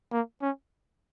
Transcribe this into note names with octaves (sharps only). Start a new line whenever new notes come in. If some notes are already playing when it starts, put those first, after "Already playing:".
A#3
C#4